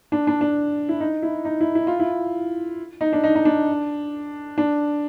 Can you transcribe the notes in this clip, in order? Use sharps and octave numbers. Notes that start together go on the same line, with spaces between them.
D4
D4
D4
E4
D#4
E4
D#4
E4
E4
F4
E4
D#4
D4
D#4
D#4
D4
D4